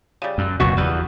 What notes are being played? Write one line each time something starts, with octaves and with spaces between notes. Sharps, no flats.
C#3 G3
F#2
F#1 F2 B2 D#3 B3 F#4 C#6
E2 G3 B4